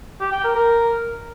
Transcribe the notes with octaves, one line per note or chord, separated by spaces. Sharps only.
G4
G5
A#4
A#4